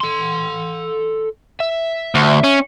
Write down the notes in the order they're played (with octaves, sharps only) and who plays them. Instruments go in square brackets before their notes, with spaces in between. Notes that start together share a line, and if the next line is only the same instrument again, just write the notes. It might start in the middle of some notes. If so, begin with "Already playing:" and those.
[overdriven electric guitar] A4 C6
E5
[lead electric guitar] D2
C#4